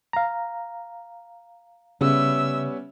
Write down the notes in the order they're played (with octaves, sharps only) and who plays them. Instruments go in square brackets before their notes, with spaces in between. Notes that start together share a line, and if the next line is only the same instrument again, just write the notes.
[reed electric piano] F5 A#5
[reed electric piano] C#3 [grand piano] G3 B3 C#4 [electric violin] E5 E6